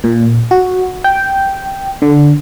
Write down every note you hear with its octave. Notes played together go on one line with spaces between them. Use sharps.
A#2
F#4
G5
D3